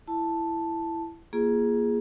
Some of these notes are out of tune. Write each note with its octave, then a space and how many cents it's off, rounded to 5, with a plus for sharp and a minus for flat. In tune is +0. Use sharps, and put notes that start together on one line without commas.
E4 +10 A5 +0
A#3 +20 F4 -30 G#4 +0